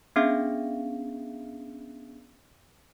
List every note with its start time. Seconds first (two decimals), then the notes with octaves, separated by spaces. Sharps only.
0.16 B3 C#4 D4 G#4 E5 F5